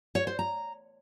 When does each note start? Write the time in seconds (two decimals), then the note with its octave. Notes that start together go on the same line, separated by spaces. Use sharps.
0.15 C#5
0.27 C5
0.39 A#5